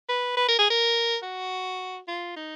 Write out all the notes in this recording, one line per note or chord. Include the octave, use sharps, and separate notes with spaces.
B4
B4
A#4
G#4
A#4
F#4
F4
D#4